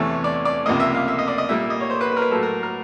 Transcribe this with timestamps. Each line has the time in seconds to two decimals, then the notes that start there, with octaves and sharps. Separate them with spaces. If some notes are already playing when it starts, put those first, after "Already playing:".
Already playing: E2 C3 E3 A3 C#5
0.24 D5
0.45 D5
0.66 C#2 C3 F3 A#3 D#5
0.80 E5
0.94 F5
1.08 E5
1.19 D#5
1.28 D5
1.38 D#5
1.48 A#2 G3 A#3 E5
1.59 E5
1.70 D#5
1.80 C#5
1.90 C5
2.01 B4
2.12 B4
2.17 A#4
2.22 B4
2.31 A2 F#3 A#3 A4
2.43 A#4
2.63 A#4